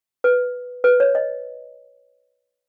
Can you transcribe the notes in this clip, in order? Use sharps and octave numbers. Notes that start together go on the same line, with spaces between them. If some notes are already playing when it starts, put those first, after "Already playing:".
B4
B4
C#5
D#5